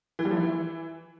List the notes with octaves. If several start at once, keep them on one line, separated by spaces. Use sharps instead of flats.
E3
G3
F3
E4
E3